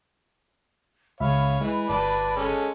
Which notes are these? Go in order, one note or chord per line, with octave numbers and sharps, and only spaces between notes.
C#2 C#5 E5 F5 B5
E3 G#3
G1 B4 D5 A5
G#3 C#4 A4